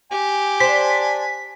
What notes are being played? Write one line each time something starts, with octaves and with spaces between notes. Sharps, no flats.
G4 G#5
D4 C5 B6